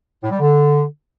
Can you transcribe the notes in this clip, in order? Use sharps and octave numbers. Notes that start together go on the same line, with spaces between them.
A2
G3
D3